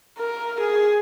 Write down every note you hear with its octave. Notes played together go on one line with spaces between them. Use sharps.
A#4
G#4